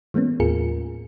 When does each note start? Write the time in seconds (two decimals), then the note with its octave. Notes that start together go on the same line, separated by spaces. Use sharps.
0.14 E3 G#3 A#3 B3 C#4
0.40 D#2 A2 F4 G#4 A#4 C#7